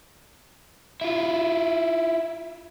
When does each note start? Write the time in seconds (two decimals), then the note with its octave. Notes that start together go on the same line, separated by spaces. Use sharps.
1.01 E4 F4